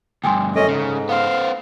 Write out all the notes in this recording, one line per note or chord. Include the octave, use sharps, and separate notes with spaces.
D2 G2 G5 G#5 C6
F#2 C#4 A4 D#5
G#2 C#3
B3 C5 F5